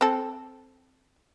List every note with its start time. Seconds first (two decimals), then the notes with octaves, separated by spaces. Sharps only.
0.01 C4 A4